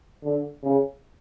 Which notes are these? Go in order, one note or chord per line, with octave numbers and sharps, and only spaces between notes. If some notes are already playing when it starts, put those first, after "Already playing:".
D3
C#3